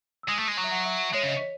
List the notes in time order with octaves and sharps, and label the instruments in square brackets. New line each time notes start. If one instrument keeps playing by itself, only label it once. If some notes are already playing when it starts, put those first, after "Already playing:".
[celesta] E6
[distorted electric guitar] G#3 [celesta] D#6
[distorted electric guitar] A3
G#3
[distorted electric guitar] F#3 [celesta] C#6
[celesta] E5
F#5
E5
[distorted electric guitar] G#3 [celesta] C#5
[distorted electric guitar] C#3
[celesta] D#5
C#5